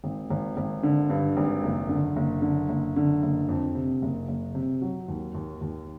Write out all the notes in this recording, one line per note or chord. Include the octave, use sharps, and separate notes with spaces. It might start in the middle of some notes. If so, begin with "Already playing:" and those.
G#1
G#1
G#1
D3
G2
G#1
F#1
D3
F#1
D3
F#1
D3
F#1
F2
C3
F#1
F#1
C3
F#3
D#2
D#2
D#2